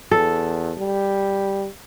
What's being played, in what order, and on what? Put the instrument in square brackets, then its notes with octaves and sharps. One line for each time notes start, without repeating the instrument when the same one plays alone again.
[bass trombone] E2 [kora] A4
[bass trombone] G3